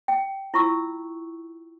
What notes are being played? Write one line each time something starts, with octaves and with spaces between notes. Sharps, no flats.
G5
E4 F4 C#6 E6